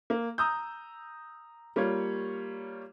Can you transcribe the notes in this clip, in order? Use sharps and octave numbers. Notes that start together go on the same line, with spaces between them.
A#3
A#5 D#6 E6 G6
G3 A#3 F4 C#5 G#6